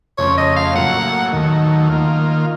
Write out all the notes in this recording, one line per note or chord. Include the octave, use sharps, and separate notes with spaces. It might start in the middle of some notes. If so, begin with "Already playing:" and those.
F2 C#3 A3 C4 C#5
D#5
F5
A2 F#3 A#3 F#5
D#2 D#3 F#3 A3
D#3 A#3 F4